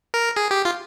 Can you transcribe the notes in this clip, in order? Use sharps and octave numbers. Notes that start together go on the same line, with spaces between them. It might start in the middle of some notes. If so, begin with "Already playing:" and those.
A#4
G#4
G4
F4